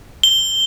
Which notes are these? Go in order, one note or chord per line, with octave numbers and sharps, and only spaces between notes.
G7